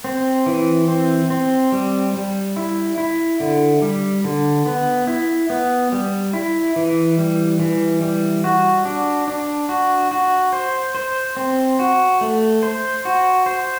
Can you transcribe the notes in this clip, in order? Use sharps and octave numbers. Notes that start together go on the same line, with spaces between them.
C4
E3
C4
C4
G3
G3
E4
E4
D3
G3
D3
B3
E4
B3
G3
E4
E3
G3
E3
G3
F#4
D4
D4
F#4
F#4
C5
C5
C4
F#4
A3
C5
F#4
C5